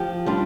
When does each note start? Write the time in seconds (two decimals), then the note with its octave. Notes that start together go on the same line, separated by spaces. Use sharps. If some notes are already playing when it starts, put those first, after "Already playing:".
Already playing: F3 G4
0.26 G3 D4 F4